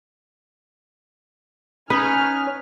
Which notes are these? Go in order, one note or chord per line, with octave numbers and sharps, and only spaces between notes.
C#4 D#4 B4 G#5 F6